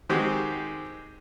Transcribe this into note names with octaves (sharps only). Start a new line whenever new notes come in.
D#3 G#3 C4 F#4 G4